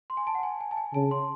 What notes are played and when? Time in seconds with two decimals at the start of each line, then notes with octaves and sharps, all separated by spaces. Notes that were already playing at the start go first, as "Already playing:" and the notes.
0.10 C6
0.17 G#5
0.27 A5
0.35 F#5
0.43 G#5
0.61 G#5
0.71 A5
0.77 G#5
0.94 C#3 A5
1.11 C6